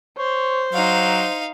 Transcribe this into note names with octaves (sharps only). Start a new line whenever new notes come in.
C5 C#5
F#3 D#4 F5